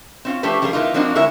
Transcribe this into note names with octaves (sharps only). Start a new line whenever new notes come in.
C4 C#4 F4
F3 A3 C#4 D4 G4 B4
F3 G3 F4 G#4 A#4
E3 A#3 D#4 F4
F3 A#3 C4 D4 D#4 F#4
D3 G#3 E4 A#4 C#5 E5